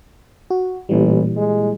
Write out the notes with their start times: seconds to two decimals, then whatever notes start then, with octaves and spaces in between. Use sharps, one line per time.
0.50 F#4
0.89 A1 A#2 E3 G3
1.36 G#3